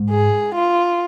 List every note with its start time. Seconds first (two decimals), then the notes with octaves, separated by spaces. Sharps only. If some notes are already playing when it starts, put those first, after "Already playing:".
Already playing: G#2
0.10 G#4
0.55 F4